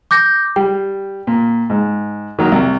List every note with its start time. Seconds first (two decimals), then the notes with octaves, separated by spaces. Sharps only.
0.11 D6 G6 A#6
0.56 G3 G5
1.27 A#2
1.70 G#2
2.39 D#3 F#3 A#3
2.52 C2